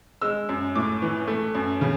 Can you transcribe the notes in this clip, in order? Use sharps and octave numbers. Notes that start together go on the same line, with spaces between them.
G#3 E6
F#2
A2 D6
E3
A3
F#2
C#3